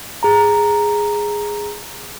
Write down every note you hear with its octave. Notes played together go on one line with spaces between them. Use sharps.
G#4 A#5